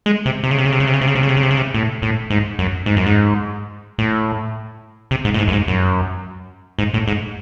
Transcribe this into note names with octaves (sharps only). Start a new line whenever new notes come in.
G#3
C3
C3
C#3
C3
C#3
C3
C#3
C3
C#3
C3
C#3
C3
C#3
C3
C#3
C3
C#3
C3
A2
A2
G#2
F#2
G#2
F#2
G#2
A2
C3
G#2
A2
G#2
F#2
G#2
F#2
G#2
A2
G#2